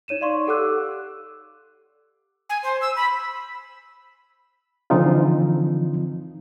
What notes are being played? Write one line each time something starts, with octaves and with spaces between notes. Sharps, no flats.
D#4 C#5 D#7 E7
D5 F5 C6 C#6
G4 A4 F#5 D6 E6 F#6
G#5
C5
E6
B5
D3 E3 F3 C4 D#4 F4